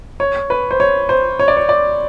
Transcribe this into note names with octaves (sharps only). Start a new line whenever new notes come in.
C#5
B4
C5
C#5
C5
C#5
D5
C#5
D5